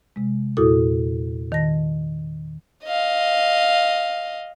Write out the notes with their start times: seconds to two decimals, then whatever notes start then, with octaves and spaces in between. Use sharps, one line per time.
0.16 C3 G#3
0.57 E2 A#2 E4 F#4 A4 D#6
1.52 D#3 A5 A#6
2.85 D#5 F5